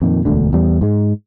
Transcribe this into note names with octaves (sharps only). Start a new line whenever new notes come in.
F2 A#2 D#3
E1 D2 D3
E2 G3
G#2 G#3